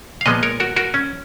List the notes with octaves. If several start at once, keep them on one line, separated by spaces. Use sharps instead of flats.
F5
A#2 F3 G#3 B3 B4 D#5
A#4 C#5
F#4 A#4
F#4 A#4
C#4